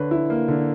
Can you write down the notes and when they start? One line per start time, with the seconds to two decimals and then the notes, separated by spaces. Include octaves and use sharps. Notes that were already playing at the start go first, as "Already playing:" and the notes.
Already playing: D3 B4 C#5
0.11 E4
0.30 A#3
0.48 D3